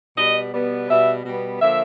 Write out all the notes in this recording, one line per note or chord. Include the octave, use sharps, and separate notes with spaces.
B2 G3 B3 D#5
B2 G3 B3
B2 G3 B3 E5
B2 G3 B3
D3 F3 A#3 E5